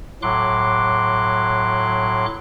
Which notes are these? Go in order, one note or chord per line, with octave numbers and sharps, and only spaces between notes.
A2 F#3 C6 D6 F#6